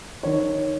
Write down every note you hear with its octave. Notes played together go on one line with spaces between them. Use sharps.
D#3 C#5